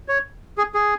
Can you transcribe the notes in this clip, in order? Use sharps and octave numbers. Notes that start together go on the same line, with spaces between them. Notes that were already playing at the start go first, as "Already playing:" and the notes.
C#5
G#4
G#4